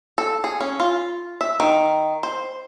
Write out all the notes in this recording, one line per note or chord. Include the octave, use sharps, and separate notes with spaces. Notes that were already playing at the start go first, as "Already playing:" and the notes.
A4
G#4
C#4
F4
E5
D#3
C5